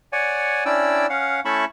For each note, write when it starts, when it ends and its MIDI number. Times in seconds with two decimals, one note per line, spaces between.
0.13 0.64 73
0.13 0.64 74
0.13 0.64 78
0.13 0.64 80
0.66 1.07 61
0.66 1.07 62
0.66 1.07 64
0.66 1.07 74
0.66 1.07 79
0.66 1.07 88
1.10 1.40 61
1.10 1.40 77
1.10 1.40 78
1.45 1.65 57
1.45 1.65 61
1.45 1.65 64
1.45 1.65 81
1.45 1.65 83
1.45 1.65 85